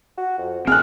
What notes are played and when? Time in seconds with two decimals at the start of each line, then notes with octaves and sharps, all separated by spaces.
0.18 F#4
0.38 F2
0.67 C4 G#4 F6 F#6